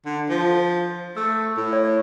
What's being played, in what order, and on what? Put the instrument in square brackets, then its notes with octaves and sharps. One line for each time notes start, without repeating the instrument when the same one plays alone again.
[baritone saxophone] D3
F3
[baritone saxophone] A3 [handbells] E6
[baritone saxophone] A2
[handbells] C#5